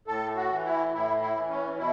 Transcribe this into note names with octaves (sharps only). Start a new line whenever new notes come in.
A2 A4
F#4
E3
E4
A2 E4
E4
E3
C#4
B2 E4